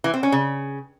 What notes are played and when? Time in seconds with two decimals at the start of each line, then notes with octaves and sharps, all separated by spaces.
0.04 E3
0.14 C4
0.23 C#4
0.32 C#3